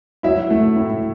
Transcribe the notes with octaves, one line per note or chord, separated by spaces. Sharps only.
F#3 E4 E5
A3
A2